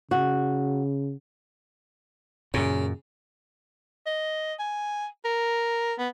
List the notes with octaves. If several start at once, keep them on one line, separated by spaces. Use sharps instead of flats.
C#3 F#4
F#2 A#2 C#3
D#5
G#5
A#4
B3